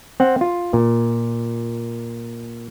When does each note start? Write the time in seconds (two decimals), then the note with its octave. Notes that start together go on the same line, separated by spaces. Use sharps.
0.20 C4 F#5
0.41 F4
0.73 A#2